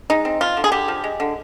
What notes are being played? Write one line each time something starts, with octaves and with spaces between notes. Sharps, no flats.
G#3 D#4
C4
F3 F4
D3
G#4
D3 G4
F3
G#3
D3